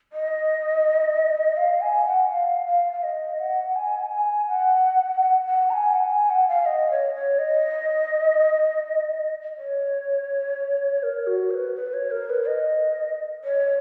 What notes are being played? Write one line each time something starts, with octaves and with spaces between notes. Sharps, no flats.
D#5
F5
G#5
F#5
F5
F5
F5
D#5
F#5
G#5
G#5
F#5
F#5
F#5
A#5
G#5
F#5
G#5
F#5
F5
D#5
C#5
C#5
D#5
C#5
A#4
F#4
C#5
B4
B4
C#5
A#4
B4
D#5
C#5